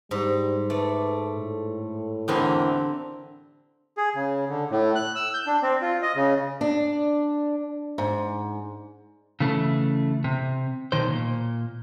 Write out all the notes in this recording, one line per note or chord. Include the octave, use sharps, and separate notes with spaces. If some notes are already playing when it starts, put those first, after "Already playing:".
G#2 G3
A3 B4 D5
A2
E2 D3 E3 C4 G4 A#4
G#4
C#3
D3
A2
F#6
E6
G6
D4
C4
F4
D#5
C#3
D4
G#2
C#3 E3 A3
C3
B1 D#3 C5
A#2